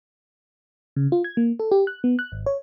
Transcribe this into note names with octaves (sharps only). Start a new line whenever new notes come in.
C#3
F4
G#6
A#3
A4
G4
F#6
B3
F#6
G#1
C#5